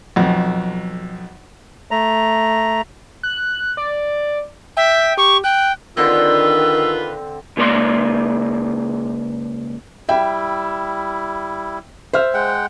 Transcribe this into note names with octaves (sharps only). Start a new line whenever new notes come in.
B1 F2
A3 A#5
F#6
D5
E5 G5
G4 C#6
G5 F#6
D3 D#3 C4 F4 B4 E6
C#3 G#3 A#3 C#5 D5 C6
G3 E4 E5 G5
C5 E5 F6
G#3 F#5 G5